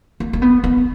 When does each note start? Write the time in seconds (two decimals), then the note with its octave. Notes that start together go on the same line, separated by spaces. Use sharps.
0.20 A#3
0.33 A#3
0.42 B3
0.64 B3